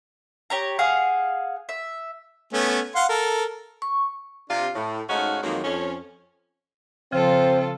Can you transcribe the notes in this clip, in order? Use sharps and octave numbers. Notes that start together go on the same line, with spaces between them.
G4 C#5 A#5
G#4 F5 F#5
E5
A3 B3 C#4
F5 F#5 C6
A4 A#4
C#6
C3 D4 F4
A2
G#2 A3 C#4 D#4 F#4 F5
F2 D#3 F#3 G#3 A#3
F2 C#4
C#3 F3 C4 F4 A4 C5